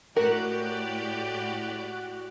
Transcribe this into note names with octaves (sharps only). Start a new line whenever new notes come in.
A2 F#4 G4 A#4 D5 F#6